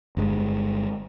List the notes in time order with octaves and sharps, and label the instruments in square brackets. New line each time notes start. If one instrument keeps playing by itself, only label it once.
[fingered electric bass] G1 G2 G#3